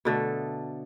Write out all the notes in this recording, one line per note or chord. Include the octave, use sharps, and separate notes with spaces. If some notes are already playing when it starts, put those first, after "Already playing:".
B2 D3 A3